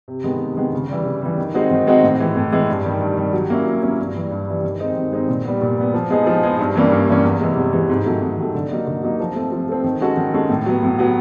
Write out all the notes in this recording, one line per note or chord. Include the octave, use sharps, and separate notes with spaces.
C3
D#3 G#3 B3
C3
D#3 G#3 B3
C#3
E3 G3
C#3
E3 G3
D#3
G#3 C4 D#4 F#4
D#3
G#3 C4 D#4 F#4
A2
E3 G#3
A2
E3 G#3
G2
D#3 G3
G2
D#3 G3
F#3
A#3 C#4 E4
F#3
A#3 C#4 E4
G2
E3 G3
G2
E3 G3
D#3
G#3 C4 D#4
D#3
G#3 C4 D#4
A#2
G3 B3
A#2
G3 B3
F3
G#3 B3 D#4 G#4
F3
G#3 B3 D#4 G#4
G2
E3 G3 A#3 C#4
G2
E3 G3 A#3 C#4
E2
C3 E3 G#3
E2
C3 E3 G#3
G#2
D#3 F#3 A3
G#2
D#3 F#3 A3
D3
F#3 A#3 D#4
D3
F#3 A#3 D#4
F3
A3 C4
F3
A3 C4
D#3
G#3 C#4 F#4 A4
D#3
G#3 C#4 F#4 A4
A2
F#3 B3
A2
F#3 B3